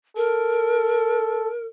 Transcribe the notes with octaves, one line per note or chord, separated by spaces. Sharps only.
A4 A#4